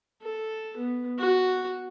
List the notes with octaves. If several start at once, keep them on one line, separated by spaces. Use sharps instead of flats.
A4
B3
F#4